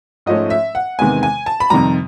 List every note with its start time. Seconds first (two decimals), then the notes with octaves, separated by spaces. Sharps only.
0.26 G#2 F3 A3 C#4 D#5
0.50 E5
0.75 F#5
0.99 E2 C3 D#3 G#3 B3 G#5
1.23 G#5
1.46 A5
1.60 B5
1.70 F2 C3 D#3 G3 A#5